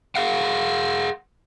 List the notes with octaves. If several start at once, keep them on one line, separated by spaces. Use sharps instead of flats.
G#4 F5 F#5